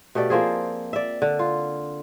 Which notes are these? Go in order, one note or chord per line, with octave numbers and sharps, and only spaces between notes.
B2 A3 G4 D5
F3 A#3 C4 G#4
D5 E5
D3
F4